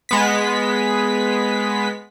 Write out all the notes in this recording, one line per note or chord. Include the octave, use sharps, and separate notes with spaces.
G#3 B3 B6